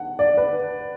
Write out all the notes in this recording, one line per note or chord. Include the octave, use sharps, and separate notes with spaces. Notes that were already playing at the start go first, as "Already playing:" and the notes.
Already playing: F#5
D5
B4